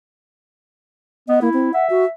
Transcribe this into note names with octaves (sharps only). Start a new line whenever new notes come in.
B3 D#5
A#3 E4
C4
E5 F#5
F#4